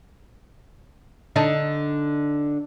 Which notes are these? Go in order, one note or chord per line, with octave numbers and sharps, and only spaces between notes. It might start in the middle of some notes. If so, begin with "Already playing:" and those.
D3 D#4 A4